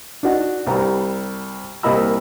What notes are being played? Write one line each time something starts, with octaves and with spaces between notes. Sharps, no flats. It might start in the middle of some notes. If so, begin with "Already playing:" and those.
D4 D#4 F#4
C2 G3 A#5
C2 A#2 A#4 D#5 B5 E6